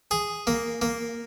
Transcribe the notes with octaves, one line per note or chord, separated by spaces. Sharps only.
G#4
A#3
A#3